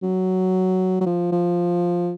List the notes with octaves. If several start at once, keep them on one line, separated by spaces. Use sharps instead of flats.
F#3
F#3
F3
F3